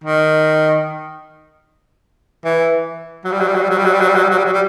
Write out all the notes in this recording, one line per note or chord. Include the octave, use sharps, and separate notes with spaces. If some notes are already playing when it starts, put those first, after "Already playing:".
D#3
E3
F#3
G3
F#3
G3
F#3
G3
F#3
G3
F#3
G3
F#3
G3
F#3
G3
F#3
G3
F#3
G3